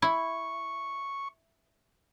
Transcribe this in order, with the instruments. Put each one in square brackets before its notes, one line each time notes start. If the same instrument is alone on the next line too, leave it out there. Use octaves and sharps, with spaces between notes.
[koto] E4 [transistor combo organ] C#6